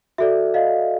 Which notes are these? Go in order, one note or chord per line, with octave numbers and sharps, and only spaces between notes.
F#4 A4 D5 E5
D#5 F5